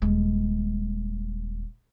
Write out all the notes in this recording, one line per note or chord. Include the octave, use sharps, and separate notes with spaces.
D#1 G#3